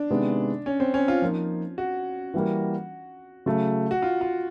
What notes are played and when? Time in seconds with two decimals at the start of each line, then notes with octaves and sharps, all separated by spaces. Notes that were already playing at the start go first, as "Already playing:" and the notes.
Already playing: D4
0.10 C3 D#3 G#3 B3
0.66 C#4
0.80 C4
0.94 C#4
1.08 F4
1.22 F3 A#3 D#4
1.78 F#4
2.34 E3 G3 A#3
3.46 C#3 F#3 A3
3.91 F#4
4.02 F4
4.21 F4